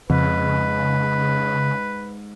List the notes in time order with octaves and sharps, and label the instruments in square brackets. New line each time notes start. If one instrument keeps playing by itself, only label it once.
[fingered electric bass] F2 [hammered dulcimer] G#2 [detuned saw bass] C#3 [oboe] B4